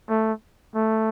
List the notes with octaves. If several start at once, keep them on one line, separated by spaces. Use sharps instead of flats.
A3
A3